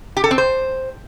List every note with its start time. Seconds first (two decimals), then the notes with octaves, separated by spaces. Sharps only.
0.17 G4
0.24 A4
0.31 C4
0.38 C5